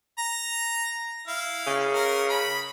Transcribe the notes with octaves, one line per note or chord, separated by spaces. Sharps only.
A#5
E4 F5
C#3
A#4
B5